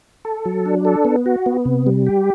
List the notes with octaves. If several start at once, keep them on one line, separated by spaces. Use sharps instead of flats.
A4
F#3
D4
A4
B3
F#4
B3
C3
G3
G4